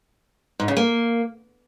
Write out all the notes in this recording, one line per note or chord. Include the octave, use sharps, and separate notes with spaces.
G#2
C#3
A#3